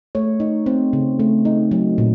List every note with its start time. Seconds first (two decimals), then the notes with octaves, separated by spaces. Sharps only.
0.15 A3 C#5
0.40 D#4
0.66 C4
0.93 C#3
1.20 A3
1.45 D#4
1.71 F#3
1.98 A#2